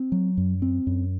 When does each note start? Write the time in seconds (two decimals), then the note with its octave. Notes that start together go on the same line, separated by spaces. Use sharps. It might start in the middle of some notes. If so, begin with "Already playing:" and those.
Already playing: C4
0.12 F#3
0.37 F#2
0.62 C4
0.87 F#2